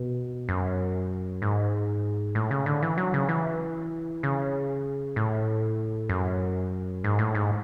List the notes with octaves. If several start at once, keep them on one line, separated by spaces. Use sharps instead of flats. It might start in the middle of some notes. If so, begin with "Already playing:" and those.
Already playing: B2
F#2
G#2
A2
C#3
D3
E3
F#3
C#3
E3
C#3
A2
F#2
G#2
A2
G#2